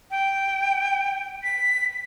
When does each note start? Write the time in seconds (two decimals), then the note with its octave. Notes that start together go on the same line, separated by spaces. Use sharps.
0.11 G5
1.43 B6